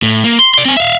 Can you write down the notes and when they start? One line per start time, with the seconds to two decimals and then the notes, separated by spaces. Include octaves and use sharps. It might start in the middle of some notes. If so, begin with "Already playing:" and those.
0.03 A2
0.24 A#3
0.39 C6
0.54 D5 C6
0.65 C4 G#5
0.77 E5 F5